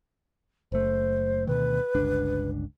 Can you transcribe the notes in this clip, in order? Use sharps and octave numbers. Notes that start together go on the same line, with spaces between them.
F#1 A3 C5
D2 B2 D#3 B4
G1 C#2 D4